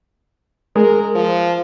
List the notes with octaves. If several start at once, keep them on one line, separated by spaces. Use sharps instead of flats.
G#3 A#4
F3